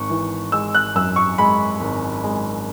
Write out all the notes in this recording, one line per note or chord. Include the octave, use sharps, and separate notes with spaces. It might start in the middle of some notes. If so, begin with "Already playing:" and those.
Already playing: G#1 C#6
E3
G#3 E6
F#6
F#2 E6
C#6
G#3 B5
G#1
G#3